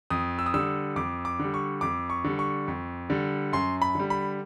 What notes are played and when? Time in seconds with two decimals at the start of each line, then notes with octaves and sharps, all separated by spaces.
0.10 F2 D#6
0.39 E6
0.46 D#6
0.54 D3 G3 E6
0.96 F2 D6
1.25 D6
1.39 D3 G3
1.54 C#6
1.81 F2 D6
2.10 C#6
2.24 D3 G3
2.39 C#6
2.68 F2
3.10 D3 G3
3.53 F#2 C6
3.82 B5
3.95 D3 G3
4.10 B5